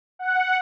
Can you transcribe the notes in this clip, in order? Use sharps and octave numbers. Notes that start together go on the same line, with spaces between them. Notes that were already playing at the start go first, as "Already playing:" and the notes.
F#5